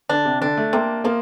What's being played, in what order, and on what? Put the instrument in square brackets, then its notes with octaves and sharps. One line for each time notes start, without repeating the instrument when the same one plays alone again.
[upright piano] D3 [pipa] D4
[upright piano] C3
[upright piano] D3 [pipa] D4
[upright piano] A3
[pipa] C3 [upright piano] A#3
[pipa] F3 [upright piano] A#3